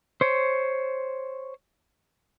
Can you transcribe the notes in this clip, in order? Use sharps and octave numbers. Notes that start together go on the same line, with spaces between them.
C5 C#5